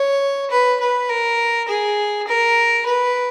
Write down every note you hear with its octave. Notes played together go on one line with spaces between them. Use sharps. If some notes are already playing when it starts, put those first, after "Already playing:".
Already playing: C#5
B4
B4
A#4
G#4
A#4
B4